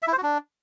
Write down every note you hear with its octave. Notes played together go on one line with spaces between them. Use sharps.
E5
E4
C5
F#4
D4